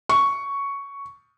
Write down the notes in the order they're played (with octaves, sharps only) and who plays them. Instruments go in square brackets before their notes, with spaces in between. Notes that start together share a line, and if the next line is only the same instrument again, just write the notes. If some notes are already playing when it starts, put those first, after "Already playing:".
[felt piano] C#6